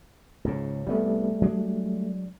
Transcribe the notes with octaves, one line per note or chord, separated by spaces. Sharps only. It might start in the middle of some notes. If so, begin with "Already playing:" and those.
C#2 G#2 C#3
C2 G3 A3 B3
F#3 G#3 D4